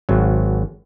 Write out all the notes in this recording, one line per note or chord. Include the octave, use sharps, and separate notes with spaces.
G#1 F#3